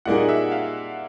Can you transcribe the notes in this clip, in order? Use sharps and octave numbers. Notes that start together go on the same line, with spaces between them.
A#2 G3 A#3 D#4 G#4 F#5
E5
F5